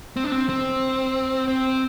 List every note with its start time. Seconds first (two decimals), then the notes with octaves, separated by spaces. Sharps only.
0.16 C4
0.24 D4
0.32 C4
0.49 C4
1.48 C4